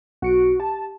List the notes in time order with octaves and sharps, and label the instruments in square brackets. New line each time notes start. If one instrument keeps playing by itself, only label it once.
[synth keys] B1 C#7 D7 [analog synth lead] F#4
[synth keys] G4 [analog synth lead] A5